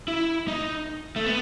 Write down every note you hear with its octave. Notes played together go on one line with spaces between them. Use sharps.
E4
D#4
A3
B3